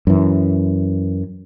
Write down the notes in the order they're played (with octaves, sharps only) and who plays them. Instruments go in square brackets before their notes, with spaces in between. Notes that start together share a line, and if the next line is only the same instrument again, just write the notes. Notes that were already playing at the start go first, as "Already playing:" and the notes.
[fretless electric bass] F#2 E3